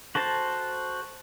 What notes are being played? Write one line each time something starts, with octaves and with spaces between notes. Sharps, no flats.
F#4 A4 C5 A5